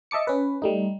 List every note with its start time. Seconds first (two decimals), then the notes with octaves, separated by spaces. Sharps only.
0.11 D#5 E5 A5 D6 C#7
0.27 C#4 B4
0.62 G3 A3 D#4